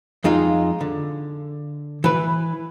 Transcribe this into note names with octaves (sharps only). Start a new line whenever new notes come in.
F2 G#3 D#4 F4
D3
E3 B4